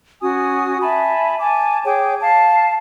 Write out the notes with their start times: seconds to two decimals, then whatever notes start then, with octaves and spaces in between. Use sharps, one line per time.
0.21 C#4 F#4 G#5 D#6
0.80 E5 G#5 A5 B5
1.40 G#5 A5 D6
1.84 G#4 C#5 G5 D6
2.21 F5 A5